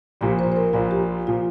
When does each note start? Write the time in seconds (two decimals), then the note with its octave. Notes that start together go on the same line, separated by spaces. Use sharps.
0.21 A#1 A#2 F3 G4
0.39 C5
0.52 C5
0.56 A#4
0.73 A#1 A#2 F3 F4
0.91 G4
1.27 A#2 F3 F4